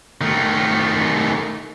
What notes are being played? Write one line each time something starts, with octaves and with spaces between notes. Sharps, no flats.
D#3 A3